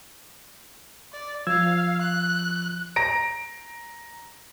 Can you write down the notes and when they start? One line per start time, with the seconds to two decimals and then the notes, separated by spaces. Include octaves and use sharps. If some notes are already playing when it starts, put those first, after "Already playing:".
1.13 D5
1.47 F3 F5 E6 G#6
2.02 F#6
2.96 A#5 A#6 D7